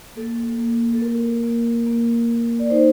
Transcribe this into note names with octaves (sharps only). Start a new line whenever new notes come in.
A#3 A4
A#3
A4
A#3 A#4
A#3
A#3
A#3
D5
D#4 C5